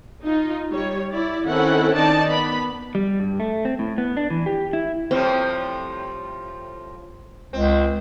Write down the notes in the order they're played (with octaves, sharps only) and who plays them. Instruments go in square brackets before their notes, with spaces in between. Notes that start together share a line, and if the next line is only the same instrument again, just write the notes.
[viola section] D#4 F4
G3 C#5
E4 D5
D#3 C4 C#4 E4 A4 F#5
D#3 D#4 D5 A5
B3 B5
[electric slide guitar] G3
G2
A3
C4
A2
B3
D4
E3
G4
E4
[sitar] A2 F3 G3 [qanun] C4
[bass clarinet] C#2 [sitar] C4